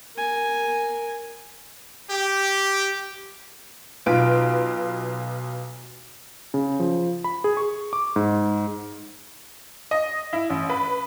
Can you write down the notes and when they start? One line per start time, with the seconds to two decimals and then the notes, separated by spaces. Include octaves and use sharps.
0.16 A#4 G#5
2.10 G4
4.06 B1 F4 B4 D7
6.54 C#3
6.80 F3
7.24 B5
7.44 G#4
7.57 C#6
7.93 D6
8.16 G#2
9.91 D#5
10.33 E4
10.50 A1
10.70 B4